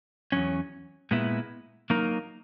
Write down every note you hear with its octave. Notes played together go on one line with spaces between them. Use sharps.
E2 B2 F#3 C#4
A#2 G#3 B3 E4
F#3 A#3 D#4 A#4